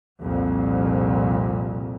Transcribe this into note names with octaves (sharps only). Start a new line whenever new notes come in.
C2 F2 A#2